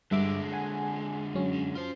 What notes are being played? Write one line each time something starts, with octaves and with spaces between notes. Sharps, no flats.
G2 D3 G#3 E5 D6
F#5 G#5
F#2 F#3 C#4
F4 C5